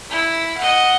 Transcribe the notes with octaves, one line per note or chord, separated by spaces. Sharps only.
E4
D#5 F#5